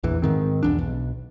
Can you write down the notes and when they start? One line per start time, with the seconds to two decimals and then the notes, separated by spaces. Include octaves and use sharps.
0.03 A#1 E2 E3
0.22 G#2 D#3 C4
0.63 B1 E2 D4
0.79 B1